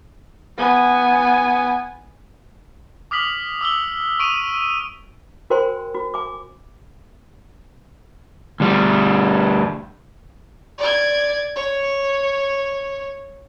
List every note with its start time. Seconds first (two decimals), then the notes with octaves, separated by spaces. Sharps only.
0.58 B3 G#5
3.11 D6 D#6 F6 B6 F#7
3.61 D6 E6 F#7 G7
4.19 C#6 D#6 D7 D#7 F7
5.50 F#4 A#4 C5 G5 G#5 C6
5.94 F#4
6.14 G#5 D6
8.60 D2 G3
10.78 D5 G#6
11.56 C#5